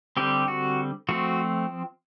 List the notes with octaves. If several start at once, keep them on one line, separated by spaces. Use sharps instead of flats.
D3 G3 C4 G4
F#4
F3 A3 C4 F#4